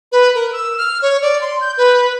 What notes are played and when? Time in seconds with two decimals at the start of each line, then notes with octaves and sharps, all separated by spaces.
0.12 B4
0.35 A#4
0.53 E6
0.78 F6
1.02 C#5
1.22 D5
1.41 C6
1.61 G6
1.77 B4